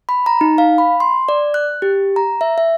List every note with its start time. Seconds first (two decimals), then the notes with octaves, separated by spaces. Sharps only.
0.09 B5
0.26 A#5
0.41 D#4
0.58 F5
0.78 B5
1.00 C6
1.29 D5
1.54 F#6
1.82 G4
2.16 A#5
2.41 E5
2.58 E5